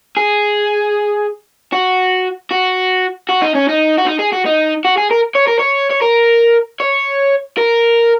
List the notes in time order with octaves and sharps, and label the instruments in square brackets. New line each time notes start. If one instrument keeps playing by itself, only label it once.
[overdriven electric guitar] G#4
F#4
F#4
F#4
D#4
C#4
D#4
F#4
D#4
G#4
F#4
D#4
F#4
G#4
A#4
C#5
A#4
C#5
C#5
A#4
C#5
A#4